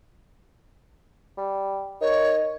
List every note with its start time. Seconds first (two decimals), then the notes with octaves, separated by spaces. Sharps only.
1.37 G3
2.01 D#4 A#4 C#5